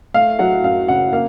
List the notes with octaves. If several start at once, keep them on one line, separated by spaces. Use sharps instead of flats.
A3 F5
F#3 F#5
F#2 F5
C#3 F#5
A#3 F5